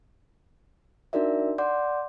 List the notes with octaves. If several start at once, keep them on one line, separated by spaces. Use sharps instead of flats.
D4 D#4 F#4 A#4 D5 E5
D5 F#5 C6 D6 G6